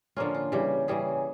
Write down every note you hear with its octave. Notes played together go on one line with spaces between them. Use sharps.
D3 F3 A#3 C#4 F4
F4
C#3 E3 G3 G4
C#3 E3 G3 G#4